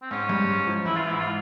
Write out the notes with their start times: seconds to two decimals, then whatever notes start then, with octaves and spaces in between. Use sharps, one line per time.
0.02 C4
0.11 G#2 C#4
0.29 G2
0.48 G#2
0.67 F3
0.85 E3 E4
0.97 F4
1.08 G#2 E4
1.20 F4